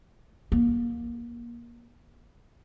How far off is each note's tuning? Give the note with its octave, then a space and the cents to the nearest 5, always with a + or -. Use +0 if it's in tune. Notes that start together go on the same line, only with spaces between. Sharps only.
A#3 +25